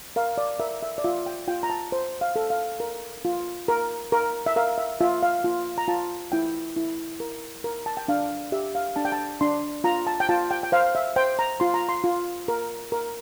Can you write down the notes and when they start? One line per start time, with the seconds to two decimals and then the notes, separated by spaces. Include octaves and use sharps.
0.16 A#4 F5
0.38 D5
0.60 A#4 E5
0.82 E5
0.98 D5
1.04 F4 E5
1.26 G5
1.48 F4 G5
1.63 A#5
1.70 A5
1.92 C5
2.21 F5
2.36 A4
2.50 F5
2.80 A#4
3.25 F4
3.68 A#4
4.12 A#4
4.46 E5
4.56 A#4 F5
4.78 E5
5.01 F4 E5
5.23 F5
5.44 F4
5.78 A#5
5.88 F4 A5
6.32 E4 G5
6.76 E4
7.20 A#4
7.64 A#4
7.86 A5
7.97 G5
8.08 D4 F5
8.52 G4 E5
8.75 F5
8.96 D4 A5
9.05 G5
9.12 A5
9.41 D4 C6
9.84 F4 A#5
10.07 A5
10.20 G5
10.29 F4 A5
10.51 G5
10.63 G5
10.72 C5 F5
10.95 E5
11.16 C5 G5
11.39 A#5
11.60 F4 C6
11.74 A#5
11.89 C6
12.04 F4
12.48 A#4
12.92 A#4